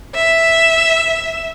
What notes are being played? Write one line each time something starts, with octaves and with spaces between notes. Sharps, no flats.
E5